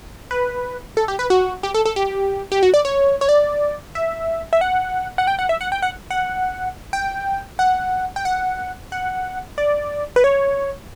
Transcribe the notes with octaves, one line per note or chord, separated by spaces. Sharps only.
B4
A4
G4
B4
F#4
G4
A4
A4
G4
G4
F#4
D5
C#5
C#5
D5
E5
E5
F#5
F#5
G5
F#5
E5
F#5
G5
F#5
F#5
G5
F#5
G5
F#5
F#5
D5
B4
C#5